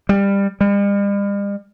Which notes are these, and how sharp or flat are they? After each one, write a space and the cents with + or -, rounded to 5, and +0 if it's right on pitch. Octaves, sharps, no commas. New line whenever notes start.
G3 +20
G3 +45